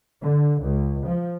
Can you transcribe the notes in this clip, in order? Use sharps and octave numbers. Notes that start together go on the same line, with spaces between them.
D3
C#2
F3